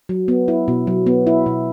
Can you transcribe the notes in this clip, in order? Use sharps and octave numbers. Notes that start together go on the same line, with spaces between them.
F#3
B3
E4
B2
F#3
B3
E4
B2